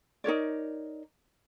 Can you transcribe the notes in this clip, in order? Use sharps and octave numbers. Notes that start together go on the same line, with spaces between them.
D#4 A#4 C#5 D5